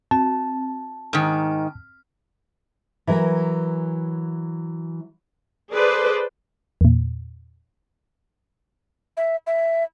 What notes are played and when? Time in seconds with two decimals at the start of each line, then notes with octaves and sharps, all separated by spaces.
0.11 C4 A5
1.13 G#2 D#3 F6
3.07 E3 F#3 A#4
5.71 G#4 A4 B4 C5 D5
6.81 E2 A#2
9.17 E5
9.47 E5